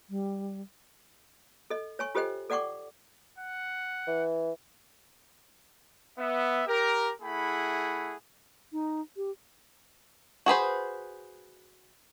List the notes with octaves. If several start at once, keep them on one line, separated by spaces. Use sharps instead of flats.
G3
A4 D#5
C#5 G#5 C#6
F4 G4 A4 C5 D#5 G5
A4 D5 F#5 G5 C#6 D6
F#5
E3
B3 E5
G4 A#4
A3 E4 G#4 F#5 B5
D#4
G4
F#4 G#4 B4 C5